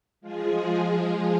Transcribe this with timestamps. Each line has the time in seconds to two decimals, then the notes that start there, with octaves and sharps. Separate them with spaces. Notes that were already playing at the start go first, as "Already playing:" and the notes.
0.21 F3 G#3 F4 G#4